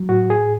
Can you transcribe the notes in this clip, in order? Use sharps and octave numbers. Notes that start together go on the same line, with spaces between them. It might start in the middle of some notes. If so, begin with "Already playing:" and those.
Already playing: F#3
A2 F#4
G#4